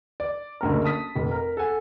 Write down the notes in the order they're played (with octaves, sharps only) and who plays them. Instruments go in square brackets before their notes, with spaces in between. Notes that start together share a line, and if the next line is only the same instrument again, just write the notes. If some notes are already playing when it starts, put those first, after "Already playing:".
[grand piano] D5
F#1 D2 A#4
A5 D#6 B6
F1
A#4
A4 F#5 G#5